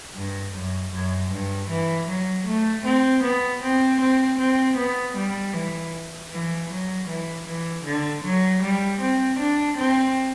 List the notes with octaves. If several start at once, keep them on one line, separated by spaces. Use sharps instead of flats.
G2
F#2
F#2
G2
E3
F#3
A3
C4
B3
C4
C4
C4
B3
G3
E3
E3
F#3
E3
E3
D3
F#3
G3
C4
D4
C4